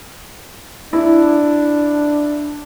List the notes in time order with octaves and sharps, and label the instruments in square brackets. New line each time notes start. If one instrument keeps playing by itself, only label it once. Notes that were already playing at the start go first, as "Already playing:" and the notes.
[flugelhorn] D4 [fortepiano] E4